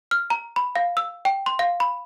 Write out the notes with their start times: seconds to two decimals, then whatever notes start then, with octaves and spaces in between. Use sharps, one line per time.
0.11 F6
0.30 A#5
0.56 B5
0.75 F5
0.97 E6
1.25 G5
1.46 C6
1.59 F5
1.80 B5